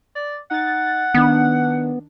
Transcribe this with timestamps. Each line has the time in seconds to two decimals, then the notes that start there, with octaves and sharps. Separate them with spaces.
0.16 D5
0.51 D#4 F#5 A6
1.14 D#3 B3 D4